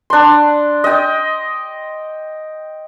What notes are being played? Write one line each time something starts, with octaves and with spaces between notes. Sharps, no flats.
D4 C6
D#5 G5